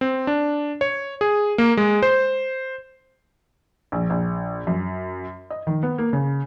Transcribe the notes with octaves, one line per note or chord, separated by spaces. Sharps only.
C4
D4
C#5
G#4
A#3
G#3
C5
A#1
A#1
F#2
D#5
D#3
B3
A#3
C#3